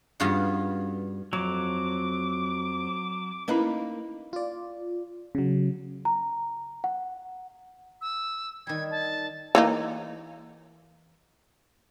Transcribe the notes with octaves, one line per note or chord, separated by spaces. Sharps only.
G2 B3 C#4 F4 F#4 G#4
F2 F#3 D6
A#3 C#4 D#4 E4 B4
F4 D5
C#3 F#3
A#5
F#5
E6
D#3 G3 G#6
A5
E3 A#3 D#4